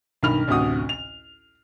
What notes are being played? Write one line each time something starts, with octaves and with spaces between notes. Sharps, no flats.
B1 G2 D#3 B5 F6 F7
A1 D2 C3 F#4 D#6
F7